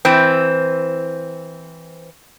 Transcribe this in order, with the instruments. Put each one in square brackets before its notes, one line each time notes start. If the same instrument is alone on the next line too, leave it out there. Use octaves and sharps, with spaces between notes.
[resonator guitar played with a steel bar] E3 C4